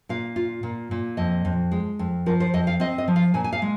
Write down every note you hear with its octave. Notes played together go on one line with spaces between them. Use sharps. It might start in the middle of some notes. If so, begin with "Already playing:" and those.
A#2 F5
F4
A#2
A#2
F2 D#5
F2
G#3
F2
F3 A#4
C5
F2 D#5
F5
C4 D#5
D#5
F3
F5
A#2 G#5
G#5
F5
G#3